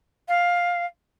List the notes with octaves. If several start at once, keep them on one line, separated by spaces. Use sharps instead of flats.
F5